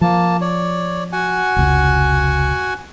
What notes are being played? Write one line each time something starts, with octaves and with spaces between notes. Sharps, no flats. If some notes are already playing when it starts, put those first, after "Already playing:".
F3 A#3 A5
C#5 D5
F#4 F#5 G#5
F1 C#2